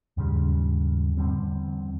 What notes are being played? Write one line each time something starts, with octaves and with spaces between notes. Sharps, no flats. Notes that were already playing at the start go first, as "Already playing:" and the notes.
D#2 G#2 C#3 G3
E2 D3 G3 C4